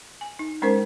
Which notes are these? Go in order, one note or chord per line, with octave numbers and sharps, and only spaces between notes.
G#5
D#4
G#3 C#4 D#4 A#4 C5